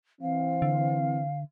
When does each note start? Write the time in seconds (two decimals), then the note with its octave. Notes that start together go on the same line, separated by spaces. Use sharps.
0.21 E3 C4 F5
0.62 D3